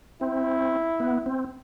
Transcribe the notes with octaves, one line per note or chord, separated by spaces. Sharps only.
C4 E4
B3
C4